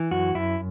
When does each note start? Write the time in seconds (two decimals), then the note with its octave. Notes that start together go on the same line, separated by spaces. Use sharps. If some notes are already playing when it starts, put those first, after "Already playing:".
Already playing: E3
0.11 F#2 F#4
0.35 F#2 E4